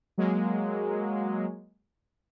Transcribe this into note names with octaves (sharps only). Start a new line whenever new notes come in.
F#3 G#3 A#3